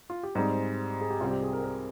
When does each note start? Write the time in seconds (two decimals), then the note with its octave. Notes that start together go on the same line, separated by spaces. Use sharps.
0.10 F4
0.23 G4
0.35 G#2 G3 C4 G#4
1.01 G#4
1.10 G4
1.20 C2 C3 G3 C4 F4
1.31 G4
1.42 G#4
1.53 A#4
1.64 A#4